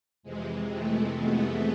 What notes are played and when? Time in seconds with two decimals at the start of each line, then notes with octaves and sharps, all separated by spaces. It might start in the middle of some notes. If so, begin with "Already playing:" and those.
0.23 F2 C3 E3 G#3
0.70 A3
1.18 B3